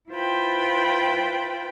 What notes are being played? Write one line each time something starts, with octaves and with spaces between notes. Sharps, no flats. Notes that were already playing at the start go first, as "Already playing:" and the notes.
E4 F4 B4 C5 G5 B5